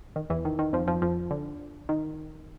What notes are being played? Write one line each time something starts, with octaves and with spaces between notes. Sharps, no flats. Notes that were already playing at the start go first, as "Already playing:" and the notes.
D#3
E2 E3
D#3
D#3
F2 F3
F2 F3
F2 F3
D3
D#3